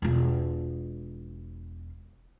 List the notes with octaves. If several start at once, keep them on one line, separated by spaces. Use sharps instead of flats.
E1 F4